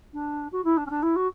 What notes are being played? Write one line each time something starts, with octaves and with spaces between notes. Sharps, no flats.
D4
F#4
E4
D4
C#4
D4
E4
F#4